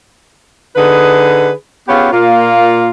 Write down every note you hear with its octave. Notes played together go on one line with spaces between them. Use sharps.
D3 D#4 G#4 B4
B3 C#4 F4 G4 G#4
A#2 A#3 F4